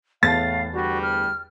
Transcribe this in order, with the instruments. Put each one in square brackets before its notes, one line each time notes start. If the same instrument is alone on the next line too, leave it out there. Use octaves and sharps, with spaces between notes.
[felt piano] E2 A5 [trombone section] A2 [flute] F5 [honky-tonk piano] A6
[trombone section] D2 G3 [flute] F#4
[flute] F6